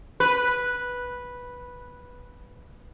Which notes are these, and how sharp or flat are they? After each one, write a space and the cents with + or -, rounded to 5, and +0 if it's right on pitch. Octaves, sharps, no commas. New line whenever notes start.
B4 -5